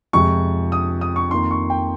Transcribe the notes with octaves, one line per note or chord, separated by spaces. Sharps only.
F2 C3 F3 G#3 C#6
D#6
D#6
C#6
F2 D#3 A#3 C6
C#6
G5